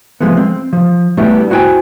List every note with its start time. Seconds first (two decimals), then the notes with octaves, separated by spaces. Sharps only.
0.20 F3 G#3 A3 B3
0.37 C4
0.73 F3
1.17 G3 A3 B3 D4 E4 G4
1.50 E4 F#4 C5 D5 G5 G#5